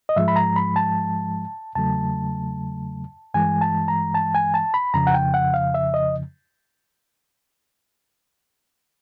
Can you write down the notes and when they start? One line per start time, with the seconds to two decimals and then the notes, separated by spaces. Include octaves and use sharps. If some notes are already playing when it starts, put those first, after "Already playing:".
0.09 D#5
0.16 G#2 F3 G#3 E5
0.28 B5
0.36 A#5
0.56 B5
0.76 A5
1.75 E2 C#3 F#3 A3 A5
3.34 G2 E3 G#3 G#5
3.61 A5
3.88 A#5
4.14 A5
4.35 G#5
4.54 A5
4.74 B5
4.94 F2 C#3 F3 A#5
5.07 F#5
5.14 G5
5.34 F#5
5.54 F5
5.74 E5
5.94 D#5